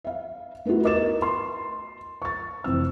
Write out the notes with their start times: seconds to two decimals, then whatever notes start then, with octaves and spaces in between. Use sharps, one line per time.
0.04 E5 F5
0.65 A3 B3 D#4 E4 F#4
0.83 A#4 B4 D#5 D6 A6 E7
1.22 C6
2.22 C#6 A6
2.64 F1 E3 C4 E6